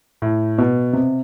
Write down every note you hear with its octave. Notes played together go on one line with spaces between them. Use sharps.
A2
B2
C3